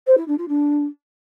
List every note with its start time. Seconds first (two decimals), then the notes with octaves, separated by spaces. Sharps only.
0.07 C5
0.17 E4
0.28 D4
0.38 F4
0.48 D4